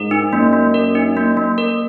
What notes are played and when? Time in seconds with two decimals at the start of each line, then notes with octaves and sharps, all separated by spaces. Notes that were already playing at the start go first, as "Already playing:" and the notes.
Already playing: G#2 A#4
0.11 D#4
0.32 F#2 A#3
0.53 A#3
0.74 A#4
0.95 D#4
1.17 A#3
1.37 A#3
1.58 A#4